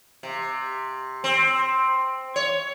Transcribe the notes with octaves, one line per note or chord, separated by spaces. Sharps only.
C3
C4
C#5